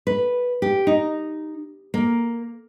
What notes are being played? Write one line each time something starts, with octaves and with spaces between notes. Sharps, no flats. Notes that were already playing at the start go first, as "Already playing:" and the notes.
B4
G4
D#4
A#3